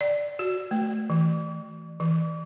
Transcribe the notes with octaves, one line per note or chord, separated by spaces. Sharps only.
D5
F#4
A3
E3
E3